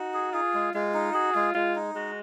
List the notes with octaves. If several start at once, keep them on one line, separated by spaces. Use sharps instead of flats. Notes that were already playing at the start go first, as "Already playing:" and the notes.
Already playing: D#4 F#4
G#4
F4 G#4
G#3
G#3 F4
D#4
F#4 G#4
G#3 F4
G#3 F4
D#4
G#3 F#4